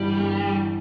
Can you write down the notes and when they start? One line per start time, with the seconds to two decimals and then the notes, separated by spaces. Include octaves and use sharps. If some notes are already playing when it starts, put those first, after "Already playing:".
Already playing: G1 G2 E3 G3
0.19 G1
0.55 E3